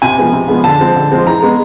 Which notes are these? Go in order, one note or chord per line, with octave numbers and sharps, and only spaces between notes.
C3 G#5
F3 G#3 B3
C3
F3 G#3 B3
D3 A5
F3 G#3 C4
D3
F3 G#3 C4
E3 A#5
G#3 B3